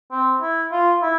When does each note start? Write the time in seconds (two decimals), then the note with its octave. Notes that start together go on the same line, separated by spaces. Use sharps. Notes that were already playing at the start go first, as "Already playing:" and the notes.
0.11 C4
0.41 E4
0.71 F4
1.02 E4